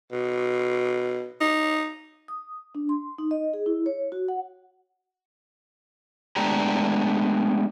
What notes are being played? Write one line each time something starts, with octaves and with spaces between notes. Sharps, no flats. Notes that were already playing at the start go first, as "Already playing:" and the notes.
B2
D#4
D#6
D4
C6
D#4
D#5
G#4
E4
C#5
F#4
F#5
G#3 A3 B3 D4 G4 A#5